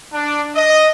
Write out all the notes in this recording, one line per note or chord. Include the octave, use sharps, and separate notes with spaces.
D4
D#5